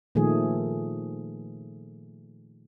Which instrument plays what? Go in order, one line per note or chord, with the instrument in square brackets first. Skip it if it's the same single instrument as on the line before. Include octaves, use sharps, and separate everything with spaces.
[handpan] A#2 D#3 F3 A3 G#4